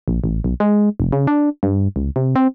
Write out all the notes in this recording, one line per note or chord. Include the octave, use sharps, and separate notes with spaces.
A#1
A1
B1
G#3
F1
C#3
D4
G2
C#2
C3
C4